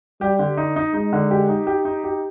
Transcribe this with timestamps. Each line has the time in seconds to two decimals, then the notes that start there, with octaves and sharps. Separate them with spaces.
0.21 G3 G4
0.39 D3
0.57 D#4
0.76 D#4
0.94 G#3 D#4
1.13 D3
1.31 G4
1.49 D#4
1.67 G4
1.85 D#4
2.04 G4